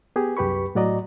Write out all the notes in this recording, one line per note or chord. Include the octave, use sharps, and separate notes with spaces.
B3 G4 G#4
C2 F#2 G4 B4 B5 C#6
A2 F#3 F#4 D5 D#5 A#5